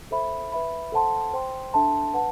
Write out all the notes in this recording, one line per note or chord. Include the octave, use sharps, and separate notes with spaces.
A4 C5 E5 B5
B4 E5 B5
A4 C5 F#5 A5 C6
C5 G5 C6
D4 A4 E5 A5 C6
B4 F#5 A5